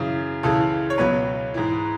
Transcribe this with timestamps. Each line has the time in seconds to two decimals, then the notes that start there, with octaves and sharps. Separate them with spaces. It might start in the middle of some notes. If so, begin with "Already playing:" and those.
Already playing: F#2 C#3 E3
0.43 C#2 C#3 E3 A4
0.90 C#5
0.98 C#2 B2 F#3 B4
1.54 G#2 E3